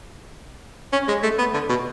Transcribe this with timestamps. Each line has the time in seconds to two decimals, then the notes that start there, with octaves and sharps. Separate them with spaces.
0.93 C#4
1.08 G#3
1.23 A3
1.39 B3
1.54 D3
1.69 B2